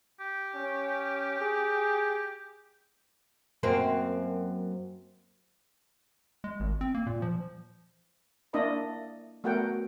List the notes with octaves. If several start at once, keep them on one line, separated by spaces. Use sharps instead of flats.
G4
C#4
G#4
F#2 A#3 C4
G#3
G#1
C4
A#3
A#2
F3
A#3 D4 E4 D#5 E5 B5
A3 B3 F#4 A#4 F#5 G5